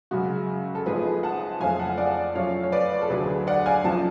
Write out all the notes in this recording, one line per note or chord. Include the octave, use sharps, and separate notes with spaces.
F#2 C#3 G#3 F#4
A4
G#1 G#2 F3 G#4 B4
F#5 A5
F#1 F2 F3 A3 F5 G#5
F#5 A5
D5 F#5
F#2 F3 A3 C#5 F5
C#5
B4 D5
A4
D2 D3 F#3 A3 G#4 B4
D5 F#5
F5 G#5
G#1 F#2 F3 A3 A5